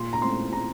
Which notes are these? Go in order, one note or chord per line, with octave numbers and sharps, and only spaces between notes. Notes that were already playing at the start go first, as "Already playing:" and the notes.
Already playing: A#2 C6
A#5
A3 C4 C6
A#2 A#5